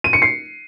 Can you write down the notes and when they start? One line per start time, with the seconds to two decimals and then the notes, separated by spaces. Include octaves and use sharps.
0.04 D#7
0.13 C#7
0.22 C7